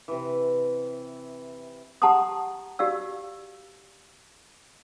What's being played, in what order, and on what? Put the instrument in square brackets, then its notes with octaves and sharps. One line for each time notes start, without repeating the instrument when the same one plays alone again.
[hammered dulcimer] C3 E3
[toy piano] G4 F#5 A5 A#5 C6 D#6
F#4 G4 D5 F5 E6